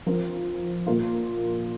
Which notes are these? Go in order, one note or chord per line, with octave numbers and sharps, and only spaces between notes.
F3 C4 F4 A#4
A#2 A#3 F4